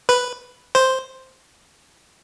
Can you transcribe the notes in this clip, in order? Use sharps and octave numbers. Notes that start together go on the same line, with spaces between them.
B4
C5